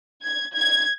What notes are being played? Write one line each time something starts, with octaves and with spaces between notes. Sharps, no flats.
G#6
G#6